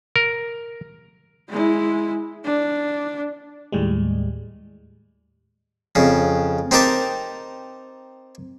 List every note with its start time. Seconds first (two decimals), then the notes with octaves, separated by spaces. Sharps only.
0.16 A#4
1.49 G#3 E4
2.45 D4
3.72 D#2 A2 G3 G#3
5.95 F2 C#3
6.71 C4 D#4 G4 A#4 A5